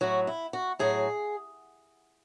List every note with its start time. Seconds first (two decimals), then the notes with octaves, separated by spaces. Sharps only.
0.01 A2 F#3 F#4
0.27 E4
0.53 F#4
0.79 A2 F#3 G#4